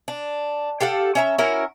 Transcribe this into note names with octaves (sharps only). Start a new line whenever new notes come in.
D4
G4 A4 F5 F#5
C#4 E5 A#5
C#4 E4 F#4 A#4